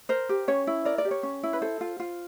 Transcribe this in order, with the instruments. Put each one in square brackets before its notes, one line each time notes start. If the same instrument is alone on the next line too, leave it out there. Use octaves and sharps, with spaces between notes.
[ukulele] A#4 C5
G4
C#4 C#5
E4
A#4 D5
D5
G4
C#5
C#4
E4
B4
A4 C5
F4
F4